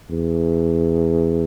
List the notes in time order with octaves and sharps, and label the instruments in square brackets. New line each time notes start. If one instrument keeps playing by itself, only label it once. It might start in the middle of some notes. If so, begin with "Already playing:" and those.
[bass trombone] E2